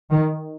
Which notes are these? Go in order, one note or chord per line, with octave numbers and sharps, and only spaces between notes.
D#3